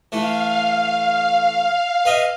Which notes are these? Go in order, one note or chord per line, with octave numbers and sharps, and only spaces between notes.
E3 A3 F5
B4 D#5 E5